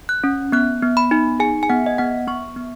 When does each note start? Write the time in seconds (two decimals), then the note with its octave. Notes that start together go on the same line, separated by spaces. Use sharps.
0.09 F#6
0.24 C#4
0.52 B3 F#6
0.82 B3
0.97 B5
1.11 D#4
1.40 G#4 G#5
1.63 G#5
1.69 B3 F#5
1.86 D#5
1.98 B3 F#5
2.27 B3 C#6
2.56 B3